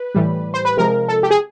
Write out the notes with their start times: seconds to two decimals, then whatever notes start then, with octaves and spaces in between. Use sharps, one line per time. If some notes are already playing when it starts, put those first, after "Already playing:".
Already playing: B4
0.15 A2 E3 G3
0.54 C5
0.65 B4
0.77 C3 F3 G#3 A#4
1.08 A4
1.23 G4
1.31 G#4